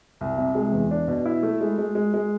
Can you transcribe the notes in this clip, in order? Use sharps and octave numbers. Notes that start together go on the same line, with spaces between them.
C2
C3
G#3
E2
D4
B2
E4
A3
G#3
G#3
G#3
G#3